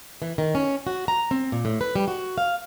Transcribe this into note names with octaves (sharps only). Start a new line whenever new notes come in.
E3
D#3
C#4
F#4
A#5
C4
A#2
A2
B4
G3
F#4
F5